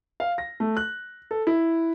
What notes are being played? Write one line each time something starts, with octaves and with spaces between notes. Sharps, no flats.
F5
A#6
A3
F#6
A4
E4